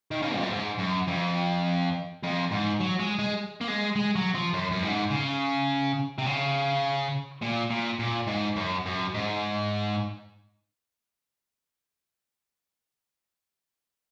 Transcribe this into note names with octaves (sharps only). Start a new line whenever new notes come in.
D#3
C#3
F2
F#2
G#2
F#2
F2
F2
G#2
F#3
G#3
G#3
A#3
G#3
G#3
F#3
F3
F#2
F#2
G#2
C#3
C3
C#3
A#2
A#2
A#2
G#2
F#2
F#2
G#2